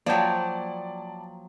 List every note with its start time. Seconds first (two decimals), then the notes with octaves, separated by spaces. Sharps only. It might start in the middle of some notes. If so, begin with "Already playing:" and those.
0.06 F3 F#3 A#3 D5 G5 A5